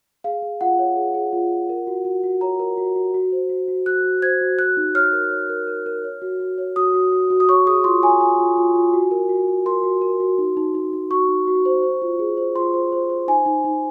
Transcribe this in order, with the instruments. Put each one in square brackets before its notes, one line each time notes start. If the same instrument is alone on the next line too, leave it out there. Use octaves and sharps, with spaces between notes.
[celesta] G#4 F5
G#4
F4 F#5
C#5
G#4
G#4
F4
F4
A#4
F#4
F#4
F#4
C#5 A#5
A#4
F#4
F#4
F#4
C5
F#4
F#4
F#4 F#6
F#4
C5 G#6
F#4
F#4 F#6
D#4
C#5 F6
A#4
C#5
A#4
A#4
A#4
C#5
F#4
F#4
C#5
F#4 D#6
F#4
F#4
F#4
D#6
C#5 C#6
G#4 D#6
F4 C6
C#5 G#5
F4 G#5
F4
F4
F4
F#4
A#4
F#4
F#4
A#4 C6
F#4
A#4
F#4
D#4
D#4
D#4
D#4
F#4 C#6
D#4
F#4
C5
C5
F4
G#4
C5
F4 C6
C5
C5
C5
D#4 G#5
D#4
D#4